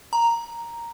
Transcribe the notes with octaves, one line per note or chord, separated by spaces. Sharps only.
A#5